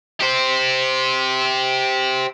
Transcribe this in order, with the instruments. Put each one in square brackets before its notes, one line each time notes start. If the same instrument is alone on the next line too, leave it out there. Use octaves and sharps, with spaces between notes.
[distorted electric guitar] G4 C5